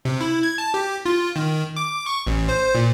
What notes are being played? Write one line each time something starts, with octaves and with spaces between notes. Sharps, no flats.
C3
E4
G#6
A5
G4
F4
D#3
D6
C#6
A1
C5
A#2